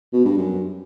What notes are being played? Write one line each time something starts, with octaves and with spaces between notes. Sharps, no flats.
B2
G2
F#2